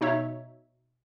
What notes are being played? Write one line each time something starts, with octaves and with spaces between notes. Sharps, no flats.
B2 D#4 C#5 E5